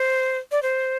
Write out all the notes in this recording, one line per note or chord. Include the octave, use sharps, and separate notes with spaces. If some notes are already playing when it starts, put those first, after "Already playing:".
Already playing: C5
D5
C5